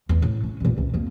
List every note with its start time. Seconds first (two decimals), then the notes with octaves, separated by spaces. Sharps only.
0.09 E2
0.22 A2
0.43 C#4
0.60 A1 A#2
0.77 C#2
0.94 F2 A#3